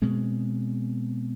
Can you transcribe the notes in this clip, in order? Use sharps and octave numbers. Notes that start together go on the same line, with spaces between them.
B2 G#3 C4